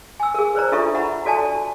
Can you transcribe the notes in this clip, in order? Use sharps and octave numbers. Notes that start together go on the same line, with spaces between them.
G#5 E6
G#4 A#4
B4 C5 D5 A#5
D4 F4 A4 E5 A#5 C#6
E5 F#5 A#5 B5
F#4 A4 D5 G#5 A5